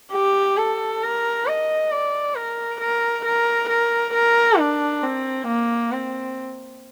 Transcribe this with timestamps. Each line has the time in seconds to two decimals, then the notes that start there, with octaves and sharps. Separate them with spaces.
0.13 G4
0.58 A4
1.03 A#4
1.47 D#5
1.92 D5
2.35 A#4
2.81 A#4
3.25 A#4
3.69 A#4
4.14 A#4
4.59 D4
5.03 C4
5.48 A#3
5.92 C4